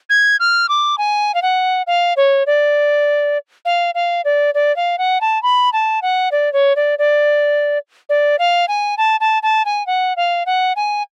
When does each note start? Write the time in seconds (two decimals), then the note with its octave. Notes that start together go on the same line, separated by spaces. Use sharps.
0.10 G#6
0.40 F6
0.69 D6
0.98 G#5
1.34 F5
1.42 F#5
1.87 F5
2.17 C#5
2.47 D5
3.65 F5
3.95 F5
4.25 D5
4.54 D5
4.76 F5
4.98 F#5
5.21 A5
5.43 B5
5.73 A5
6.02 F#5
6.32 D5
6.53 C#5
6.76 D5
6.99 D5
8.09 D5
8.39 F5
8.68 G#5
8.98 A5
9.20 A5
9.43 A5
9.65 G#5
9.87 F#5
10.17 F5
10.46 F#5
10.76 G#5